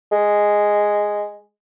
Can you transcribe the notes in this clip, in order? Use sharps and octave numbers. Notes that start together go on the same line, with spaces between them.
G#3